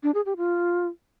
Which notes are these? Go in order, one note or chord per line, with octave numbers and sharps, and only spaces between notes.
D4
G#4
G4
F4